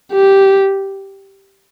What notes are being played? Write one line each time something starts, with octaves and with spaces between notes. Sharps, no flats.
G4